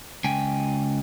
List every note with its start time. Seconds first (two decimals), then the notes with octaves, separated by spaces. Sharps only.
0.24 C#2 G5 G#5